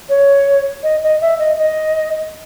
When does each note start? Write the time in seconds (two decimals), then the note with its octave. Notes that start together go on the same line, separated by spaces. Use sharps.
0.09 C#5
0.83 D#5
1.03 D#5
1.21 E5
1.39 D#5
1.58 D#5